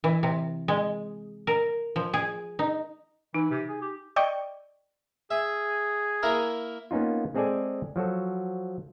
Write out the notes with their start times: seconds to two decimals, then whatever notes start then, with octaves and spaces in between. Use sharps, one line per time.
0.04 E3
0.23 C3
0.68 G#3
1.47 A#4
1.96 F3
2.14 G#4
2.59 D#4
3.34 E3 D#4
3.51 C3
3.69 G#4
3.82 G4
4.16 D5 D#5 G5 C#6
5.31 G#4 E5
6.23 A#3 E4 A#4
6.91 A#3 B3 C#4 D#4 F4
7.34 G#3 C4 G#4 A4 D5 G#5
7.96 F3 F#3 F#4 A4